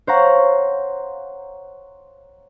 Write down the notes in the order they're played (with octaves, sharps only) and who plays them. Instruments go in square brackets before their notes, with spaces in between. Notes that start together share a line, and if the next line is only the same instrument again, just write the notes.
[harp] C5 C#5 F5 F#5 A#5 C6